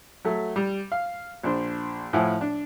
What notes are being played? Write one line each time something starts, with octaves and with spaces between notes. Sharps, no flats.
F#3 A3
G3
F5
A#1 D4 C5
A2 F3 E4 F#5 G#5
D4